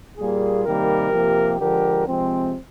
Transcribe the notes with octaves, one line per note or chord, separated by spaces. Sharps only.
A#2 G3 A#3 F4 G#4
C3 D#3 G3 A#3 G4 A#4
C3 F3 A#3
D3 F3 G#3 G4 A#4
C3 F3 G#3 C4